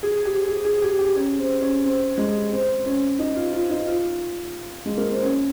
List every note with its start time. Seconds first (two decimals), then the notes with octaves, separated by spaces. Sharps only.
0.03 G#4
0.25 G4
0.48 G#4
0.65 G#4
0.82 G4
0.99 G4
1.16 C#4
1.39 C4
1.61 C#4
1.84 C4
2.18 G#3
2.51 C4
2.86 C#4
3.19 D#4
3.36 F4
3.53 F4
3.70 D#4
3.87 F4
4.86 G#3
4.98 A#3
5.10 C4
5.22 C#4